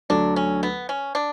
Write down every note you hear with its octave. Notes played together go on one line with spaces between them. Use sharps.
D2 D3 F#3 D4
C#4
B3
C#4
D4